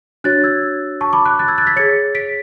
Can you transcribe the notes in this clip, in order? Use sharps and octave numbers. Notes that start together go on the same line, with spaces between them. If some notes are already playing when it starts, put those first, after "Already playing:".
D4 F#4 C#5 F#6 A6
E6 G#6
A5 C#6
B5 D6
D6 F#6
F#6 A6
E6 G#6
F#6 A6
G#6 B6
G#4 C#5 A6 C#7
B6 D7